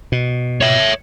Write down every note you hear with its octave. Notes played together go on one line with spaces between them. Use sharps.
B2
C#5 E5